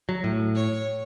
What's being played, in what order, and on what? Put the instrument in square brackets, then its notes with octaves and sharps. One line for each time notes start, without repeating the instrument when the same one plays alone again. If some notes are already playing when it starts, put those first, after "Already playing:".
[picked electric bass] F#3
A2
[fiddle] C#5